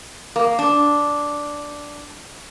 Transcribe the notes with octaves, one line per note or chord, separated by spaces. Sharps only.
A#3
D4